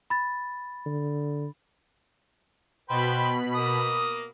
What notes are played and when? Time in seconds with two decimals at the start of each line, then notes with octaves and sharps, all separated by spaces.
0.10 B5 A6
0.86 D3
2.90 B2 B4 C5 G5 B5
3.55 A#3 D#6